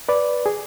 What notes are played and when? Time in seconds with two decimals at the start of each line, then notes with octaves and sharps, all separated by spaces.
0.09 B4 D5
0.46 G#4